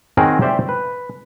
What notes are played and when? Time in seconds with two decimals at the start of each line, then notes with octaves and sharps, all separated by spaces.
0.17 D#3 C4 C#4 F#4 G#4 A#4
0.42 G4 C5 D5 E5
0.69 B4